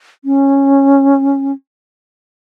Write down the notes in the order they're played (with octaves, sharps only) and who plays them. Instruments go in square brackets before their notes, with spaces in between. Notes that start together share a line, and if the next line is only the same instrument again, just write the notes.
[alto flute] C#4